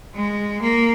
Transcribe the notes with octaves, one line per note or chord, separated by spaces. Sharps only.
G#3
A#3